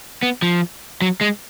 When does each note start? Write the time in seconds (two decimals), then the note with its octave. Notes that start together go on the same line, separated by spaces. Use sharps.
0.23 B3
0.42 F3
1.02 F#3
1.21 G#3